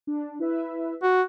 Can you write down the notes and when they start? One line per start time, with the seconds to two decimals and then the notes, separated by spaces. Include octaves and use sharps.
0.07 D4
0.39 E4 B4 E5
1.02 F#4